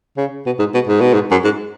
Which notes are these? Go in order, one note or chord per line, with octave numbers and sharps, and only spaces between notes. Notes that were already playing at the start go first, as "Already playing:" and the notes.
C#3
B2
G#2
B2
G#2
B2
G#2
F#2
G#2